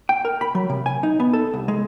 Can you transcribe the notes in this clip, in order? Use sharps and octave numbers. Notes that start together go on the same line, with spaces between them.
G5
A#4
B5
F#3
C3
G#5
D#4
B3
A4
C2
G#3